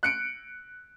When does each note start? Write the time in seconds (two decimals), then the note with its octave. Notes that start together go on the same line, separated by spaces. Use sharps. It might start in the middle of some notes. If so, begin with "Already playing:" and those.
0.03 F#6 C#7 D7